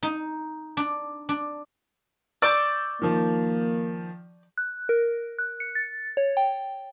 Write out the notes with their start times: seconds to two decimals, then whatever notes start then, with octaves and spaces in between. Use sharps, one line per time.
0.03 D#4
0.77 D4
1.29 D4
2.42 D5 C#6 D6 E6 G6
3.02 D#3 F3 A#3
4.58 F#6
4.89 A#4
5.39 F#6
5.60 C#7
5.75 A6
6.17 C#5
6.37 G5